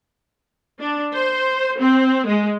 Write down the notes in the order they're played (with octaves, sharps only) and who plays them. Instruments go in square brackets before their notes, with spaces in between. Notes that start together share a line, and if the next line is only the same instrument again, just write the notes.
[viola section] D4
C5
C4
G#3